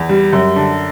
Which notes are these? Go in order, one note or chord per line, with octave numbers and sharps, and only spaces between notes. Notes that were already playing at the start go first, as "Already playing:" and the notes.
Already playing: E2
G3
F#2
D3